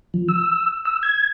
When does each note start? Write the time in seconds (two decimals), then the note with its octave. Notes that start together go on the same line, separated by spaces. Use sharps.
0.14 F3
0.28 E6
0.85 E6
1.03 G#6